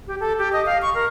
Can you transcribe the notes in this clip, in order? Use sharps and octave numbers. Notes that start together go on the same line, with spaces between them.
G4
A4
G4
D#5
F5
C#6
A#4